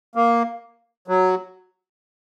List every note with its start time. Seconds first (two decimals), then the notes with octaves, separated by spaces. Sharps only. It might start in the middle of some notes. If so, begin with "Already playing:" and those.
0.15 A#3
1.08 F#3